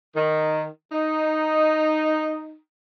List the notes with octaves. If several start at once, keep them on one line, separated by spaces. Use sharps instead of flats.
D#3
D#4